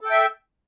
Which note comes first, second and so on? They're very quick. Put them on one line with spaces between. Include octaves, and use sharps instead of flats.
A4 G5 E5